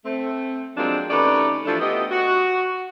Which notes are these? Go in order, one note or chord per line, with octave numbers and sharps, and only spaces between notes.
A3 C4
F3 F#3 G#3 A#3 C4 D4
D#3 A3 C#4 G4 B4 D5
E3 F3 G3 A3 D4
A3 B3 G4 D#5
F#4